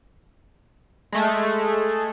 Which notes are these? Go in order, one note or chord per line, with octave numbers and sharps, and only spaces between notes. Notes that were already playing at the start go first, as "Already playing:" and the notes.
G#3 A3